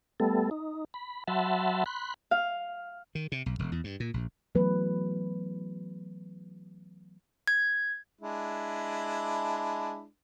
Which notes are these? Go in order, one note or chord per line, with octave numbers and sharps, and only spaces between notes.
G3 A3 B3 A4
D#4
B5
F#3 E5 F#5 A5 B5 C6
B5 C6 F#6
F5
D#3
C3
B1
E1
E2
G2
A#2
A#1
E3 F#3 A3 B3 B4
G#6
G#3 D4 E4